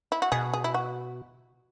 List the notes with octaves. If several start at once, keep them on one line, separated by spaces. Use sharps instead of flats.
E4
F#4
B2 G#4
G#4
E4
F#4